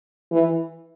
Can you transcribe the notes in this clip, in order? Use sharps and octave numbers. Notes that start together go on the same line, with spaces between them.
E3